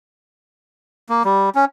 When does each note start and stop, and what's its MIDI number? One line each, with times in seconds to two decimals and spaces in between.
1.09 1.23 58
1.25 1.50 55
1.55 1.65 61